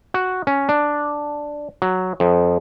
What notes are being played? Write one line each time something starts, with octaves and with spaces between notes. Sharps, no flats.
F#4
C#4
D4
F#3
F2